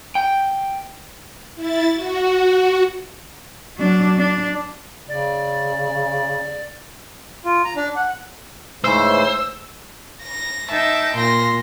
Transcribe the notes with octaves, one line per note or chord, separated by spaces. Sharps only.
G5
E4 A6
F#4
F#3 D4
D4
C#3 D5
F4
A#5
D4
F#5
G#2 C#3 E3 A3 C5 E6
A#6
D#4 E5 G5 A5
A#2 C6 A#6